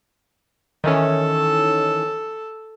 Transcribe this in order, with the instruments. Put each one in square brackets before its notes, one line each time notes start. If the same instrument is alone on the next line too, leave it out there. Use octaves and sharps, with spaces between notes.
[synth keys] D#3 E3 C#4 [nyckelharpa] A4